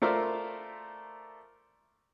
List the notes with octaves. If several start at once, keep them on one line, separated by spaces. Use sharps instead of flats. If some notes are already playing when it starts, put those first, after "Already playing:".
A3 F4 A#4 C5 D5 E5